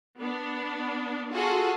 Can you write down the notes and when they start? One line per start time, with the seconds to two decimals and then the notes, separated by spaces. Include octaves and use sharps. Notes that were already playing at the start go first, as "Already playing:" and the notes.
0.18 B3 D4
1.32 F4 F#4 G#4 A4 F#5